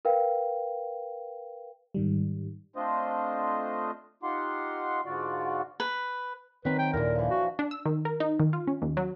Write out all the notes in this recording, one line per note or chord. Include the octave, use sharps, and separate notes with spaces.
A#4 B4 F5 G5
G#2 D#3 G3
A3 C4 D4 F4 C5 D#5
D#4 F4 G4 F#5 C6
G#2 D3 F4 F#4 D5
B4
D#3 F#3 C4 B4
G5
D#2 A#2 D3 E3 A#4
E3 F3
F#4
D4
E6
D#3
A#4
D#4
D#3
F4
C#4
D#2
F#3